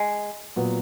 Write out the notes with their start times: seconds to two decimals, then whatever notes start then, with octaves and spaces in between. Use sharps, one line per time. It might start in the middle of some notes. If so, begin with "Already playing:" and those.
Already playing: G#3
0.56 A#2 F#3 B3